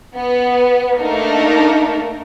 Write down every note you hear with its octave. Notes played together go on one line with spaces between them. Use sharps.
B3
A3 A#3 D4 D#4 A4 A#4